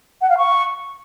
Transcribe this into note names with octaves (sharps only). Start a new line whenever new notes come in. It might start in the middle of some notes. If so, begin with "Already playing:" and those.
F#5
F5
C#6